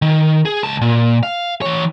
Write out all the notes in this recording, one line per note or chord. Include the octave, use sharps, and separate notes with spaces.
D#3
G#4
C#2 A5
A#2
F5
E3 C#5